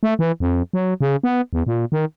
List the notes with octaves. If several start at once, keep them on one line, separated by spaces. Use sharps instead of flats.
A3
E3
F2
F#3
C#3
B3
E2
A#2
D#3